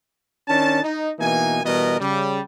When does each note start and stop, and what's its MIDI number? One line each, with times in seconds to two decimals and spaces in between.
0.48 0.79 51
0.48 0.79 61
0.48 0.79 62
0.48 0.79 81
0.83 1.10 63
1.19 1.61 47
1.19 1.61 52
1.19 1.61 58
1.19 1.61 63
1.19 1.61 80
1.65 2.00 47
1.65 2.00 52
1.65 2.00 55
1.65 2.00 59
1.65 2.00 70
1.65 2.00 75
2.00 2.41 49
2.00 2.41 55